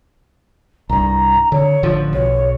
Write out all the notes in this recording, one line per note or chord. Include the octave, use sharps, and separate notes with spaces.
C2 G2 A#5
D3 C#5
A1 D3 F3
B1 C#5